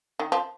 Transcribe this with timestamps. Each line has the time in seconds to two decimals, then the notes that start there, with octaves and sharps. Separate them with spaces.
0.19 D#3
0.32 F3